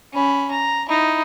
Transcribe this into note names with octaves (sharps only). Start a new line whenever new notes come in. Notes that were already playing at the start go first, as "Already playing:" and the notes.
C#4 B5
A#5
D#4 E4